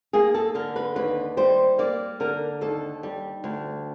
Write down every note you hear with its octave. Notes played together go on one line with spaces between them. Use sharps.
A#3 G#4
A4
D3 A#4
B4
D#2 B4
G3 C5
A#3 D5
D3 A#4
D#2 A4
G3
D2